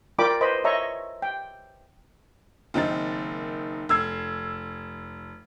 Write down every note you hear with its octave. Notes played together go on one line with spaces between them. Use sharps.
F4 A#4 D5 G5 B5 D6
B4 C5 D#5 B5
C#5 D#5 E5 A#5 C#6
G5
F#1 D#3 C4 D#4 A6
F1 E6 G#6 C7